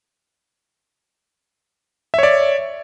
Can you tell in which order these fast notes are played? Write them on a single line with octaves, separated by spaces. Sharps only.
E5 C#5 D5